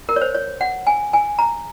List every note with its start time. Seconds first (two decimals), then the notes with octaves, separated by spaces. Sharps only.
0.09 A#4
0.16 C#5
0.21 C5
0.35 C#5
0.61 F#5
0.87 G#5
1.13 G#5
1.39 A#5